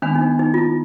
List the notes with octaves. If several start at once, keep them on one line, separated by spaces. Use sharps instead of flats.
D#3 G#3 B3 D4
D#4
D4
D#4
F4
E4